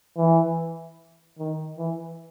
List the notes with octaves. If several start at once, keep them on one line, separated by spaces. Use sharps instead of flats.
E3
D#3
E3